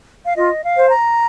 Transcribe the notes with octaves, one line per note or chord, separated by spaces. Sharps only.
F5
F4 D#5
F5
C5
A#5